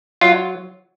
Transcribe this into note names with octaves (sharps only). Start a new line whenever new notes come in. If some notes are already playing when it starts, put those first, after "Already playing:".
F#3 F4